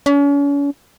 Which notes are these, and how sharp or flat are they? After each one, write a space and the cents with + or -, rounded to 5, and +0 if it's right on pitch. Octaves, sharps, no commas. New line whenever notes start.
C#4 +40